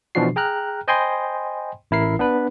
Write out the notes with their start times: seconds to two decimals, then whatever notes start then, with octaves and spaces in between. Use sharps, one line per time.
0.15 B2 E3 F3 D4 F#4 C7
0.36 G#4 G5 A#5 F6 F#6
0.88 C5 D#5 G5 G#5 B5 C6
1.91 A1 E4 A#4 C7
2.19 B3 D4 B4